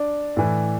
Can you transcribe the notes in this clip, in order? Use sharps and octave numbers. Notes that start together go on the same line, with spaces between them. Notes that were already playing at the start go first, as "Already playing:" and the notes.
Already playing: D4
A2 E3